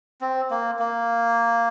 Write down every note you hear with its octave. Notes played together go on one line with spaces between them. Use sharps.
C4
A#3
A#3